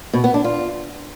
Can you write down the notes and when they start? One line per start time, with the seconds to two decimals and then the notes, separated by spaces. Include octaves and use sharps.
0.13 B2
0.24 B3
0.34 D4
0.44 F4